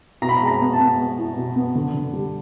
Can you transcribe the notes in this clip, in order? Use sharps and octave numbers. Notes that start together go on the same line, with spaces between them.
B2 A#5
B5
A#5
G#3
A#5
B3
A5
B3
G#3
E4
B2
B3
D3
D3
G3